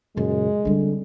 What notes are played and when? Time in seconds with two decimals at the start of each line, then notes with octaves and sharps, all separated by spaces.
0.17 F#2 A#2 C#3 G#3
0.65 D3 G3 C4